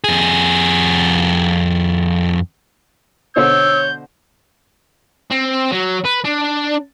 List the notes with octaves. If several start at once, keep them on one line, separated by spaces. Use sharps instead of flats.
F2 G#4
B2 D3 C5 C#5 E6 G6
C4
F#3
B4
D4